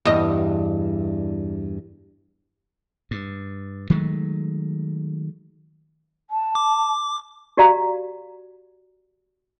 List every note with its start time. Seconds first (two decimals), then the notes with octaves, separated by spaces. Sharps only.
0.05 E2 G2 D#5
3.11 G2
3.90 D#3 F#3 G#3 A3
6.30 A5
6.55 D6
7.57 F#4 G4 D5 F5 A#5